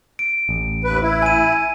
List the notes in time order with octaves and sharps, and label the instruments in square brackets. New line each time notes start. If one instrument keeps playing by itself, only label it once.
[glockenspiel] D7
[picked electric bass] A1
[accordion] D#2 B4
E4
[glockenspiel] G#5 D#7